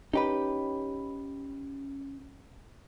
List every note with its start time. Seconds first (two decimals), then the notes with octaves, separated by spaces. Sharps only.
0.13 C#4 D#4 G4 B4